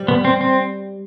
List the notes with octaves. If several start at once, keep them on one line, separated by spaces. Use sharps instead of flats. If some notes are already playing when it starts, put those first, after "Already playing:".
Already playing: G3
B3
C4
C4